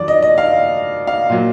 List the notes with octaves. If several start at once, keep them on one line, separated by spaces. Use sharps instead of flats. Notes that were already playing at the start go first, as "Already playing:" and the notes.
Already playing: F2 D#3 F#3 D5
D#5
D#5
F5
F5
A#2 F#3